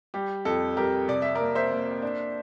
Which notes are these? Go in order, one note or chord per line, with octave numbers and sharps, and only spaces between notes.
G3 G4
F2 A4
G3 G4 A#4
C3 D5
E5
A#4 D5
A#3
C5 E5
A#3
D4